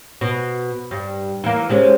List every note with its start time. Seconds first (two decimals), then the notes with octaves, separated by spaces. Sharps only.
0.21 B2
0.91 G2
1.44 E3 A#3
1.69 C3 G#3 C#4